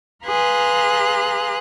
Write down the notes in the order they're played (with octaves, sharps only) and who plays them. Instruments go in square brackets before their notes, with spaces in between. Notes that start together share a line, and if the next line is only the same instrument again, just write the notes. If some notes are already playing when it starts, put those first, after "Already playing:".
[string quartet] G#4 B4 F5 A#5 C6 F#6